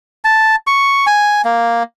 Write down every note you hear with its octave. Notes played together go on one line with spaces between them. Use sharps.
A5
C#6
G#5
A#3